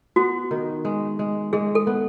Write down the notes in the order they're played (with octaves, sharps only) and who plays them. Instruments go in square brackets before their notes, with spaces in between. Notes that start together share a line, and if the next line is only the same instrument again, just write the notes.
[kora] B3 [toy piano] F#4
[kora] D#3
G#3
G#3
[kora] G#3 [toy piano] G#4
[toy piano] A4
[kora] B3